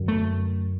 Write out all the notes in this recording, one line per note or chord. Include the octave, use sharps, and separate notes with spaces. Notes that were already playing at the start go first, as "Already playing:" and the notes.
Already playing: F#2 D3
A3